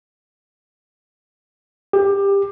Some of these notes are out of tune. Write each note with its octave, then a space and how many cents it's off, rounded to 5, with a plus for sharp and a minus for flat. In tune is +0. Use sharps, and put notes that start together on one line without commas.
G4 +20